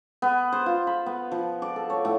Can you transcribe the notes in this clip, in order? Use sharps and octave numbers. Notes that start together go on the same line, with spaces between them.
B3
C5
F4
B5
B3
F3
D5
A4
C#5
A2